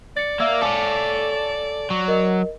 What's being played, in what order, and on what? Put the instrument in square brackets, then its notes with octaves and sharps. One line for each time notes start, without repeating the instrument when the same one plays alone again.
[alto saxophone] D5 [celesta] A6 C#7
[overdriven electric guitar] A#3 [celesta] E5 E6 G#6
[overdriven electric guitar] A4 C#5 [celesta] F5 G#5 D6
[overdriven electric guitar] F#3
[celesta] A#4 D#5